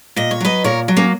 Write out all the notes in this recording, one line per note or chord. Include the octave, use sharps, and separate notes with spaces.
A#2 D#5
C#5
F#3 B4 D#5
A#2 A#4 C#5
F#3
A#3 C#4